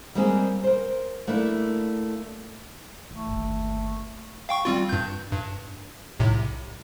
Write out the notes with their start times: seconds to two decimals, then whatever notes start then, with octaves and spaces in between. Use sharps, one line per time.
0.15 G3 G#3 A#3 C4 F4 G#4
0.64 A#4 C5
1.27 A3 A#3 D4 E4
3.11 E3 A3
3.27 G1 D#2
4.49 F5 G5 C#6
4.65 G3 C4 F4
4.89 G2 G6
5.32 G2
6.20 B1 A2 C3